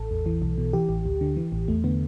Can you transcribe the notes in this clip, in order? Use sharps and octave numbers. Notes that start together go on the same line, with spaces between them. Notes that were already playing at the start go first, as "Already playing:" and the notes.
Already playing: A1 A4
E2
E3
B1
B2
E3 G4
A1
D2
D3
E3
A1
E2 A3
D3 B3